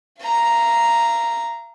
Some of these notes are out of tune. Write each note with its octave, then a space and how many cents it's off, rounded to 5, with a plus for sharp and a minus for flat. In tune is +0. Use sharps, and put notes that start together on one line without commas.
F5 -35 A#5 +0